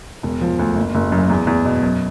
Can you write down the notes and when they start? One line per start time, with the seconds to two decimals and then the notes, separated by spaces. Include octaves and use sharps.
0.23 E1
0.41 F3
0.59 D2
0.76 F#1
0.95 F#1
1.12 F#2
1.29 E2
1.47 E2
1.65 B2
1.83 F#2